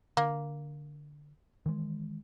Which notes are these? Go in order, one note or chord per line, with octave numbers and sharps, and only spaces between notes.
D3 A#3
D#3 E3 G#3